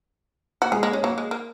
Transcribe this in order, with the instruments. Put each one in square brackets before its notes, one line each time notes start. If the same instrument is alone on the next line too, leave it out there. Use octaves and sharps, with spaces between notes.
[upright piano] A#3 [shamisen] F#4
[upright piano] G#3 [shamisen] G#4
[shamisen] G#3 [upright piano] A#3
[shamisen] G#3 [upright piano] C#4
[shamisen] F#3 [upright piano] A#3
[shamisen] G#3
A#3